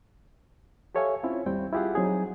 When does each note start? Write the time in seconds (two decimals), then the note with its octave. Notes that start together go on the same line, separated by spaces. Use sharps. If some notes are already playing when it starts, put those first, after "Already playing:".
0.95 G4 A4 C#5 E5 F5 G#5
1.23 C4 C#4 E4 F4
1.46 D#2 G3 C4 G5
1.72 E4 F4 G4 G#4 F#5
1.95 F#3 C4 D#4 G#4